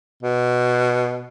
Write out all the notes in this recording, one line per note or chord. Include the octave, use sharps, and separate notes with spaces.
B2